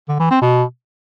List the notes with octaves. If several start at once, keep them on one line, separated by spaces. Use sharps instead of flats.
D3
E3
C4
B2